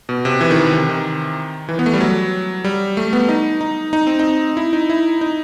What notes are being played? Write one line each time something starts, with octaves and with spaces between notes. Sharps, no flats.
B2
C3
E3
D#3
E3
C3
D#3
E3
B3
A3
G3
F#3
G3
A3
B3
D#4
D#4
D#4
C4
D#4
E4
D#4
E4
D#4